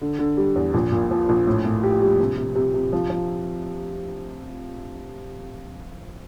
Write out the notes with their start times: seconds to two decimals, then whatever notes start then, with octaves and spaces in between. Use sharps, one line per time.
0.02 D3
0.19 D3
0.37 G3
0.56 E2
0.74 A#1
0.92 A#2
1.11 F3
1.29 A#1
1.47 A2
1.65 A2
1.83 G4
2.02 G3
2.20 C3
2.37 C3
2.55 C3
2.74 C3
2.93 F3
3.10 F3